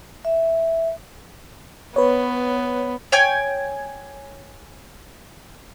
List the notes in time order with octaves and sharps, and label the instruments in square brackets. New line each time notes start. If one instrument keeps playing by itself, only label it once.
[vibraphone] E5
[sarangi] B3 [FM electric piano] B4 C#5
[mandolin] C#5 G5 G#5